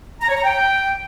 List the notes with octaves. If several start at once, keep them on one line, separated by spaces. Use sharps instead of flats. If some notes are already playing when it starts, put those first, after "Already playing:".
A#5
C#5
A#5
G5